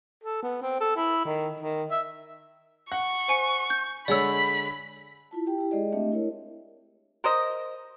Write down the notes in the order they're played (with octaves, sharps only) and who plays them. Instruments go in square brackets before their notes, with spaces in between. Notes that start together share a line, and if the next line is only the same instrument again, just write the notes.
[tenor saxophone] A4
B3
C4
A4
E4
D#3
D#3
E5
[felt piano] F#5 [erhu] C#6
[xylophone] C5 G#5 C#7
G6
[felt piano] D3 G#3 C#5 [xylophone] D5 E6 [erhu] B5
[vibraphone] E4 F4 A5
G4 G5
E4 G4
G#3 G#4 D5 D#5
A3 C4 D4 G4 D#5 E5
E4 A#4 C#5
[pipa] A#4 C5 D#5